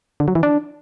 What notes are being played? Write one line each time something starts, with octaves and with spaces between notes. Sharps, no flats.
D3
F#3
E3
D4